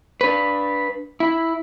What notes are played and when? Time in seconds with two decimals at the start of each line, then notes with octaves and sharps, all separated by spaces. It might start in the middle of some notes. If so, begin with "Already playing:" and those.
0.21 D4 B4
1.20 E4